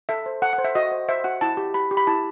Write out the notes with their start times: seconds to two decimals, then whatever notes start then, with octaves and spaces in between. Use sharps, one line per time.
0.09 A4 E5
0.26 C5
0.42 A4 F#5
0.53 F#5
0.58 C5
0.64 E5
0.75 F#4 D#5
0.92 C5
1.09 C5 E5
1.24 F#4 F#5
1.41 E4 A5
1.57 G4
1.74 G4 B5
1.91 G4
1.97 B5
2.07 E4 A5